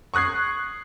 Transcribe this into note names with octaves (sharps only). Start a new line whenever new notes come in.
C#6 D#6 F#6 G#6 C7